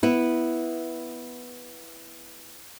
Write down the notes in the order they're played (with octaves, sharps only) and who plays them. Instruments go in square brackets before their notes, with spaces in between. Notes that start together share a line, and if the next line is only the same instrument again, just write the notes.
[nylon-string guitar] B3 E4